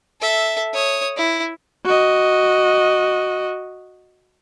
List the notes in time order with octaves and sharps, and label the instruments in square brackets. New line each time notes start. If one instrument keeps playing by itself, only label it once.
[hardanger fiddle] A4 E5
C#5 D#6
E4
[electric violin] F#4 D#5